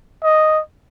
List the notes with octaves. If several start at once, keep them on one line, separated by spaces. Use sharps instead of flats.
D#5